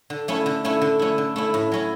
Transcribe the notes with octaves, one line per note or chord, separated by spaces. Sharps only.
D3
A3 C#4 E4
D3
A3 C#4 E4
D3
A3 C#4 E4
D3
A3 C#4 E4
A2
F#3 C#4 E4